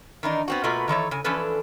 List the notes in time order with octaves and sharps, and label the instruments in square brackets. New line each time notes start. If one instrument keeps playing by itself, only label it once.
[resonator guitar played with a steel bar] D#3 E3 D4 D#4
B3 C4 F#4
B2 A3 A#3 F4 F#4 B4
D#3 E3 A4 C#5
C#3 G#5
E3 F3 C#4 D4 A4 B4